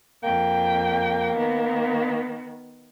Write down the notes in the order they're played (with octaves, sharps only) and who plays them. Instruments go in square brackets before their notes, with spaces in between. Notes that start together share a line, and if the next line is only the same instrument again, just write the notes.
[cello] F2 G5 [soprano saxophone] A#3
[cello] D#3 B3